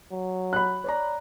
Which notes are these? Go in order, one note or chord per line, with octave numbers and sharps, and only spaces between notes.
F#3
B5 F#6
C#5 D5 A#5